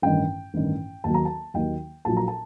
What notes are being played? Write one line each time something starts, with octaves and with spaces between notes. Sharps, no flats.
A1 G2 D#3 G5
A1 G2 D#3
D#2 D#3 F#3 A5
A#5
A5
D#2 D#3 F#3 G5
A#1 A#2 F#3 A5
A#5
A5